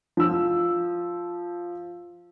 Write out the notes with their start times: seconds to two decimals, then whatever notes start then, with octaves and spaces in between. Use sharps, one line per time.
0.17 F3 E6